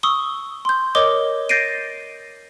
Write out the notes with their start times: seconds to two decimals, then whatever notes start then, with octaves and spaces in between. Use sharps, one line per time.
0.03 C#6 D#6 E6 G7
0.65 C6 G6
0.95 A#4 C#5 D#5 D6 D#6 G7
1.49 G6 A6 A#6 C7 D7 D#7